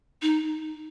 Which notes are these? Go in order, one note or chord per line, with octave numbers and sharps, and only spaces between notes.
D#4